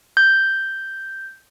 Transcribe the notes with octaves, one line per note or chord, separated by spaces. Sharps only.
G6